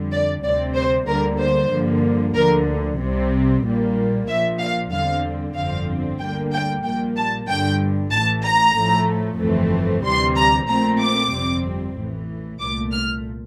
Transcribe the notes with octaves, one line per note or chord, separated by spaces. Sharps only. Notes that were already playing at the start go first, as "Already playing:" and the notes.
Already playing: F2 D3 G3
D5
D2 C3 G3 C4 D5
C5
D2 D3 G3 A#3 A#4
C5
G2 D3 F3 A#3
D2 D3 F3 A#4
C2 C3 G3 C4
A#1 A#2 G3 A#3
A#1 A#2 F3 E5
F5
E2 D3 G3 C4 F5
G1 F2 D3 F3 C4 F5
D2 D3 G3 A#3 G5
G5
A#1 A#2 G3 A#3 G5
A5
G1 G2 D3 G5
A1 A2 E3 A5
A#5
A2 F3 A3
G1 F2 E3 A3 C4
D2 C3 E3 G3 C6
A#5
A#1 A#2 A3 C4 A#5
D6
G1 F2 C3 G3 C4
A1 A2 E3
C2 A#2 A3 D6
F6